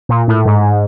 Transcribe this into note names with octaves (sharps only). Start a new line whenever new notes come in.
A#2
A2
G#2